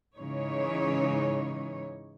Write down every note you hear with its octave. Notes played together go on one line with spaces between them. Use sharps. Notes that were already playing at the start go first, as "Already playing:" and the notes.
G#2 C#3 E3 G#3 D#4 C#5